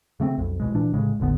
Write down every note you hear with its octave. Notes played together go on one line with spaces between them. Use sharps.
C#3 A3 A#3 C4
B1 F2
C2 B2 G#3
A#2 E3 D4
C2 A2 C#3 G#3
E1 A1 D3 B3